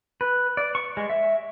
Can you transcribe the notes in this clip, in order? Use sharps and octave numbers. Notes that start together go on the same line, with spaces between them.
B4
D5
C#6
G#3
E5